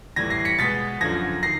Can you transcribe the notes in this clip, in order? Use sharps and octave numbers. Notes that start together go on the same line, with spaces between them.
A2 E3 G3 G#6 A#6
A#6 C7
B6 C#7
B2 G#3 B3 A6 B6
F#2 D3 F3 G#6 A#6
D#3 A#6 C7